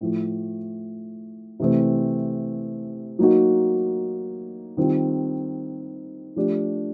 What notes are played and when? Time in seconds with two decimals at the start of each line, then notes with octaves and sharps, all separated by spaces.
0.01 A2 F3 A3
1.59 C3 E3 A3 C4
3.19 F#3 A#3 D#4 F#4
4.77 D#3 G3 C4 F4
6.36 F3 A3 D4 G4